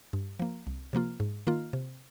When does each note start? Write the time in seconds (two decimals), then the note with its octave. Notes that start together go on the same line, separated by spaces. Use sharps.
0.13 G2
0.40 F3 A#3
0.67 C2
0.93 C3 F3 A#3 F4
1.20 G#2
1.47 D#3 A#3 F4
1.73 C3